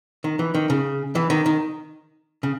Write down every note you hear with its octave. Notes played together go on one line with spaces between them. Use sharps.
D#3
E3
D#3
C#3
E3
D#3
D#3
C#3